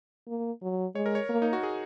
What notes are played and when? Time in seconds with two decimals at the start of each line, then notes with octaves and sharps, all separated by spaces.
0.28 A#3
0.62 F#3
0.95 G#3 C#5
1.06 A#4
1.15 C#5
1.29 A#3
1.42 D#4
1.53 F#4
1.63 G#4